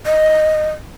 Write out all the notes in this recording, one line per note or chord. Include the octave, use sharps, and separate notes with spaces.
D#5